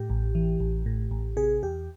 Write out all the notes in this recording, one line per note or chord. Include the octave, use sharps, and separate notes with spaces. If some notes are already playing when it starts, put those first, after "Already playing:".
Already playing: A2 G4
A1
E3
A1
A2
A1
C3 G#4
E2 G4